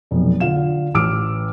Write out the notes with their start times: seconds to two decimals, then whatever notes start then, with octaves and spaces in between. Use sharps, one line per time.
0.11 F1 B1
0.40 D3 F4 F5 E7
0.94 A1 D6 E6 F6 D7